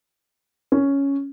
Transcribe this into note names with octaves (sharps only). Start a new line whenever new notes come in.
C#4